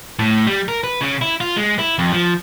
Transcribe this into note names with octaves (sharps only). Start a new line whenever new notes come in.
A2
G3
A#4
B4
C#3
E4
F4
G#3
E4
F2
F3